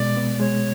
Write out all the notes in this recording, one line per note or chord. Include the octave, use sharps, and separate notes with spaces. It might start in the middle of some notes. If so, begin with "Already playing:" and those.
Already playing: B2 G#3 D5
B3
G#3 C#5